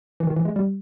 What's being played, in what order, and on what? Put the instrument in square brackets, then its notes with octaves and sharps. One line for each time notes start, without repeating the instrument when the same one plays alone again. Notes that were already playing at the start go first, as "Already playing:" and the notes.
[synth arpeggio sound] E3
D#3
E3
G#3
G3